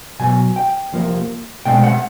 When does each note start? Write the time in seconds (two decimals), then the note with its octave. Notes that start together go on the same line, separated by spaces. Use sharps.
0.19 B2 F#3 B3 G#5
0.56 G5
0.92 C2 C3 F3 A#3
1.65 C2 B2 G#3 C4 G5
1.84 F#5